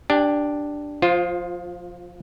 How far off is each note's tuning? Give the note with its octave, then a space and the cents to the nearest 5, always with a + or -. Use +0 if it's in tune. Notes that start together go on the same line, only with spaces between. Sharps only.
D4 +0 G4 +0 G#5 -45
F3 +30 F4 +0 C5 +0